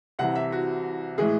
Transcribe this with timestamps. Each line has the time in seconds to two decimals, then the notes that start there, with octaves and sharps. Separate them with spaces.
0.19 C2 C3 E3 F#5
0.36 E5
0.52 F#4
1.18 A2 E3 G#3 G#4